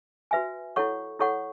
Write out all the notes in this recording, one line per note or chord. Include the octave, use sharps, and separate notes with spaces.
F#4 B4 E5 G#5
E4 A4 C#5 F#5 C#6
E4 A4 C#5 F#5 C#6